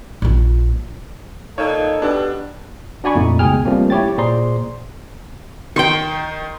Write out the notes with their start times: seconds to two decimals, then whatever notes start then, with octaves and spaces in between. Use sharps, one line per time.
0.22 A#1 F4
1.58 A#2 D#4 A4 C#5
2.02 B2 D4 G4
3.04 D4 F#4 D5 G#5 B5 C#6
3.15 F2 A#2 A3 D#4
3.39 C#2 B2 G#4 G5 G#5 F6
3.65 F3 G3 A3 A#3 C4 C#4
3.90 E4 G4 C#5 G5 A6
4.18 A#2 G#4 C5 D5 A#5 C6
5.76 D#3 G5 C6 C#6